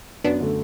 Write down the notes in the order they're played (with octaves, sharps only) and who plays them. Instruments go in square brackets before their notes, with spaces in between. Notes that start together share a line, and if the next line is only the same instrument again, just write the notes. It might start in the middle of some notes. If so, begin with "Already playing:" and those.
[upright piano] F#2 [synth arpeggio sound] B3 D4
[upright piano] D3 A3